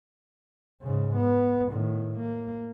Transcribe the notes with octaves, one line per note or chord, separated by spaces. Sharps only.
G#2 C#3
B3
A2 D#3
A#3